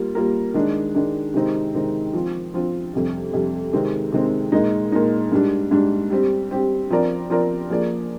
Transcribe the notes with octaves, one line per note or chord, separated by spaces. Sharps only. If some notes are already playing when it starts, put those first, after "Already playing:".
Already playing: G3 A#3 F4
G3 A#3 F4 A#4
D#3 G#3 D4
D#3 G#3 D4
C3 D#3 G#3 C4 D#4
C3 D#3 G#3 C4 D#4
F3 C4 F4
F3 C4 F4
F2 C3 G3
F2 C3 G3
C3 D#3 G#3 C4
C3 D#3 G#3 C4
A#2 G#3 D#4
A#2 G#3 D#4
G#2 G3 D4
G#2 G3 D4
G3 C4 G4
G3 C4 G4
F3 C4 F4 A#4 D5
F3 C4 F4 A#4 D5
F3 A#3 F4 G#4 D5